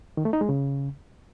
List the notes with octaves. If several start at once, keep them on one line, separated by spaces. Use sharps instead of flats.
D#3
A3
D#4
G#3
C#3